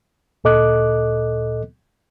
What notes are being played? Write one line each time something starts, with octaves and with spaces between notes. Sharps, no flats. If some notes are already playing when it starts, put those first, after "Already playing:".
D2 A#2 A4 D#5 D6 F#6